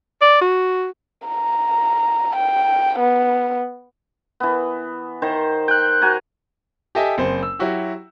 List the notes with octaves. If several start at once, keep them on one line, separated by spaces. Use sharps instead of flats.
D5
F#4
A#5
G5
B3
E3 B3
D#3 C5
G5 F#6 G6
F#4 G#5 A#5
G4 A4 D#5 E5 G#5
F#1 C4 C5
E6
F#3 E4 F#4 G4